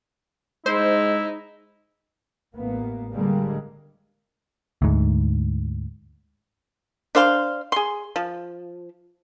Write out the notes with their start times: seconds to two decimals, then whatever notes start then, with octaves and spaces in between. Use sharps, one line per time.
0.66 G#3 D#4 E4 C5
2.55 A1 A#3 B3
3.14 D3 G3 G#3 A#3
4.82 D2 G#2
7.15 D4 C5 F5 C6
7.72 G#4 C6
8.16 F3